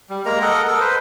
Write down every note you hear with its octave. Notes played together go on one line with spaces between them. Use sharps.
G3
G#3 A#3 A#4 A#5
A4 A#4 D#5 F#5
A4 A#4
B4 C5